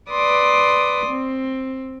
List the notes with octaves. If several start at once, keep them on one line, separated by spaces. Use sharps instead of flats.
B4 D5 C6 D6 D#6
C4